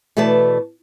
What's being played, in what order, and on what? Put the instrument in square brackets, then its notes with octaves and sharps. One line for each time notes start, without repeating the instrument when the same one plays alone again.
[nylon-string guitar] B2 E3 A3 B4 D5 A5